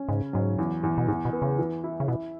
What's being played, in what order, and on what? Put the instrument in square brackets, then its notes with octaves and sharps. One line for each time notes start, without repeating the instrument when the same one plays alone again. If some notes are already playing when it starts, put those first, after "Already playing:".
Already playing: [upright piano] C#4
[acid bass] G#2 [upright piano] C#3
[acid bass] G#2 [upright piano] F#3
[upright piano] E2
E2
[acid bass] B2
[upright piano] E2 [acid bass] G#2
[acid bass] B2
[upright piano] B3
[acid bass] C#3
[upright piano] E3
E4
[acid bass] C#3
[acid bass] B2 [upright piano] E4